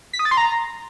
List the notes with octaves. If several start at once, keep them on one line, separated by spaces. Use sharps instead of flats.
B6
D#6
A6
C6
A#5